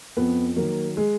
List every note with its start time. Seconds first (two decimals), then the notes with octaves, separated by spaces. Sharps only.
0.17 F2 B3
0.56 D#3 F#3 A#3
0.97 G#3